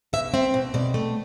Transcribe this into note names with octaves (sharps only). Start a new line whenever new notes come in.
B2 E5
C4 E5
B2
B2 D5
A3